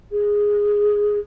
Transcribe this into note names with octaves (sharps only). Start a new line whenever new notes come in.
G#4